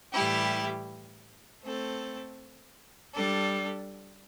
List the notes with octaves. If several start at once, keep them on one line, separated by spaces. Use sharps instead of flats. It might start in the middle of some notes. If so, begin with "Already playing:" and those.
A2 E3 G3 E4 G4
A3 C4 A4
G3 D4 A4